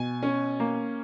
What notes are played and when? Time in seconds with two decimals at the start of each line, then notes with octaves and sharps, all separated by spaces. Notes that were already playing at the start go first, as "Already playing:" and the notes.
Already playing: B2 G#5
0.23 C#4
0.60 A#3